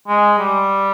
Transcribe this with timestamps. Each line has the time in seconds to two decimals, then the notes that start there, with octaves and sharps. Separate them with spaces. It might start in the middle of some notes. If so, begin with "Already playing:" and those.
0.08 G#3
0.39 G3